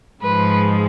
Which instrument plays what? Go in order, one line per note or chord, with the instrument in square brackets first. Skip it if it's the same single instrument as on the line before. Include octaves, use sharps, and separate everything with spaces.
[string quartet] G#2 F3 G#3 B4